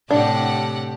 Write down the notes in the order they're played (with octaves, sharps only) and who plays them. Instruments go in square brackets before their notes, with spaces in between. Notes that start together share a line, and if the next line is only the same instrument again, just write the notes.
[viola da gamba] A2 C3 [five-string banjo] D4 [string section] G4 F#5 [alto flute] A5